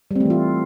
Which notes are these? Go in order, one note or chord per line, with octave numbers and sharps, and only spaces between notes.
E3 G3 A3 C4 F4